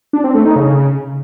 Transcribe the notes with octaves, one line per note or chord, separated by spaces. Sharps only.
D4
C4
A3
D#4
C#3